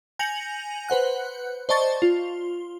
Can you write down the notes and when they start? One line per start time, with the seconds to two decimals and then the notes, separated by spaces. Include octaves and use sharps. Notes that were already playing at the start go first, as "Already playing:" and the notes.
0.19 G#5 G6 A#6 C#7 F7 F#7
0.89 B4 C5 F#5 F#6
1.69 C5 D5 D#5 A5 C#6 A6
2.02 F4